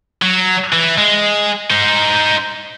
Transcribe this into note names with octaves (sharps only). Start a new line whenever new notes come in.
F#3
E3
G#3
D#4 C5